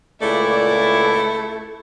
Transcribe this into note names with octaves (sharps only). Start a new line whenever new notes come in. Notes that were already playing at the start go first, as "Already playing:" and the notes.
C#2 A#2 A3 E4 D5